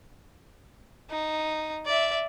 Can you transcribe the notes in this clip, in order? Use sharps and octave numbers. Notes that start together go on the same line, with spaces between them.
D#4
D5 E5